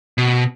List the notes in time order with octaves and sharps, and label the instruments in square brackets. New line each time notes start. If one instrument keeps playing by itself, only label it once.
[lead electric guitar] B2